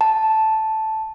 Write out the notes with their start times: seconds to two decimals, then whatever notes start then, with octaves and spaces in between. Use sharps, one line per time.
0.01 A5